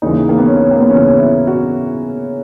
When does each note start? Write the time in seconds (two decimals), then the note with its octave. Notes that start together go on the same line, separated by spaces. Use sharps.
0.02 D#2 C#3 E3 D#4
0.29 A#3
0.37 B3
0.46 C#4
0.71 A#3
0.80 B3
0.89 D#2 C#3 E3 C#4
1.18 E4
1.47 F#4